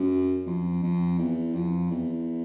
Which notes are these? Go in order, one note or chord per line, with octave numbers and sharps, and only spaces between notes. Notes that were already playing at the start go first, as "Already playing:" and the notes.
Already playing: F#2
F2
F2
E2
F2
E2